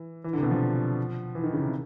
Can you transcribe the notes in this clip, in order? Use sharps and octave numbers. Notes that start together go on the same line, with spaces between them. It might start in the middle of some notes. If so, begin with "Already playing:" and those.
Already playing: E3
E3
D3
C3
B2
F3
E3
D#3
C#3
C3